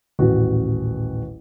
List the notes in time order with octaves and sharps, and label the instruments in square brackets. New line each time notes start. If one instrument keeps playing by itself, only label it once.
[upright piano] D#1 A1 F#4